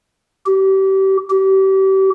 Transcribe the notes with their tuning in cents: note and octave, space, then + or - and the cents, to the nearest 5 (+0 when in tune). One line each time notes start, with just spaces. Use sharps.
G4 -30
G4 -35